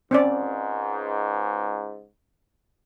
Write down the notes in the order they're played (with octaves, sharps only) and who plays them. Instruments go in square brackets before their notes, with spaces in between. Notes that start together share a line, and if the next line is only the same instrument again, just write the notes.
[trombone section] C#2 G#2 [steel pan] C4 C#4 D5